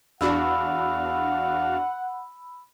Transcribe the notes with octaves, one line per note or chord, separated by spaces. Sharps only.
E2 D4 F#4 F5 F#5 B5 E6